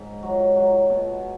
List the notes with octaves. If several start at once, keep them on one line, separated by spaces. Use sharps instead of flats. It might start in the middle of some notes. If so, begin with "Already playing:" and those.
Already playing: G#2
F#3
F#3
B2